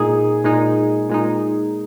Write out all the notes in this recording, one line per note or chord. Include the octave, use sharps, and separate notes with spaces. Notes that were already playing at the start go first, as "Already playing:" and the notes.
Already playing: A#2 G#3 D#4 G#4
A#2 G#3 D#4
A#2 G#3 D#4